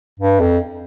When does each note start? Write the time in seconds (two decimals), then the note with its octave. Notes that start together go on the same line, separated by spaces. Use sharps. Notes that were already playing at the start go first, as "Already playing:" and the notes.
0.19 G2
0.40 F2